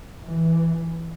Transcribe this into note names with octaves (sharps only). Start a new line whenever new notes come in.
E3